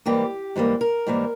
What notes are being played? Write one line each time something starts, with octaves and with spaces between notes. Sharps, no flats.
G#2 E3 G3 A#3 G4
G#2 E3 G3 A#3
A#4
G#2 E3 G3 A#3